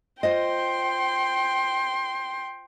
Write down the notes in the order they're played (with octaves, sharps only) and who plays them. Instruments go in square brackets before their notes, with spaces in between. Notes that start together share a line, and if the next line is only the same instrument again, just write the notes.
[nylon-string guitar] F4 C5 D#5 [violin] G5 C6